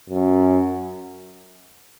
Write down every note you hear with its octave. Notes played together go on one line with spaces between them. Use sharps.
F#2